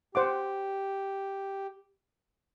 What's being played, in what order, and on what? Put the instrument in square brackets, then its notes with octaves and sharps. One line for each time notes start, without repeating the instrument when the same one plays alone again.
[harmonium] G4 [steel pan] C5 F#5 D6